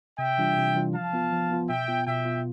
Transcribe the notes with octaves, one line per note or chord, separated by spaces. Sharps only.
C3 E5 G5
E3 G3 D4 F4
C3
E3 G3 D4 F4
F3 F5 A5
B3 F4
F3
B3 F4
B2 E5 G5
B3 F4
B2 E5 G5
B3 F4